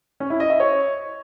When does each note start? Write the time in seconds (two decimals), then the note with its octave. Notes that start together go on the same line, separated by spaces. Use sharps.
0.20 C#4
0.30 E4
0.40 D#5
0.50 E5
0.60 C#5